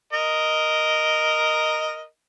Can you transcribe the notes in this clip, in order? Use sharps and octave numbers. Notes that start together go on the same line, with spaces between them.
A#4 D#5